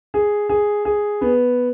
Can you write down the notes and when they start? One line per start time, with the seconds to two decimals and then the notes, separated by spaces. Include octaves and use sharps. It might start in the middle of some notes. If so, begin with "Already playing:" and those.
0.14 G#4
0.49 G#4
0.85 G#4
1.21 B3